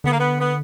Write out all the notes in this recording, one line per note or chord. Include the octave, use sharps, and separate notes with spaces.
D3 B3
A#3
B3
B3